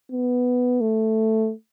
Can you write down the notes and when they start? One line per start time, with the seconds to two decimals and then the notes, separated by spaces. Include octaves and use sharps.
0.11 B3
0.81 A3